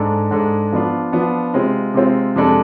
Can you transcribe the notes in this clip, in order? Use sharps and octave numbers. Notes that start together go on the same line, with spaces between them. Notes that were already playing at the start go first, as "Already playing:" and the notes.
Already playing: G#2 G#3 D4 A4
G#2 G#3 D4 A4
F3 B3 D4 F4
F3 B3 D4 F4
C3 G#3 C4 F4
C3 G#3 C4 F4
F2 C3 G#3 D4 A4